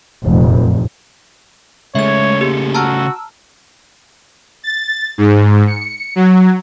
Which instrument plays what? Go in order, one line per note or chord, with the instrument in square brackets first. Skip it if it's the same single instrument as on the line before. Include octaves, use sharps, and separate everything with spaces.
[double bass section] F1 F#2 A#2
[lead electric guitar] C#3 A3 [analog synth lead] G#3 [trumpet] C#5 [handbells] E5 G#6
[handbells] A#3 G4 G#4 [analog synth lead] C#7
[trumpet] F#4 [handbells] A5 A#5 F6 [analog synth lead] E6
[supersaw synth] A6
G#2
C#7
F#3